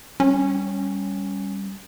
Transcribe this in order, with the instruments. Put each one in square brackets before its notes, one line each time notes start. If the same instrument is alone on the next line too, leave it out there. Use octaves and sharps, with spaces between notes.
[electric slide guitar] G3 C#5 [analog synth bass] C#4